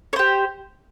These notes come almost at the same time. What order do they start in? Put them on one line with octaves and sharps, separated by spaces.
C#5 C5 G4